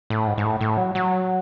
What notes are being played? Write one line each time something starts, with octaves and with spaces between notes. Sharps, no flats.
A2
G#2
G#2
A2
A2
F#3
F#3